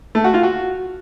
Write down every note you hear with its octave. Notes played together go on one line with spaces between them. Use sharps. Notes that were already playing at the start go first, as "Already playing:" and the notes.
A3
F#4
F4
F#4